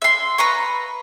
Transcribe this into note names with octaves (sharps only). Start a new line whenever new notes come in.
E5 C6
B4 A#5 C#6